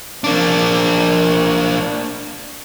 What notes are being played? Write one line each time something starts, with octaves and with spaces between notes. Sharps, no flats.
A#3 D4